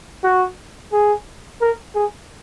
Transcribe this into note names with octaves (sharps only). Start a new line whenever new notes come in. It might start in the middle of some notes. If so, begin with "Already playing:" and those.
F#4
G#4
A#4
G#4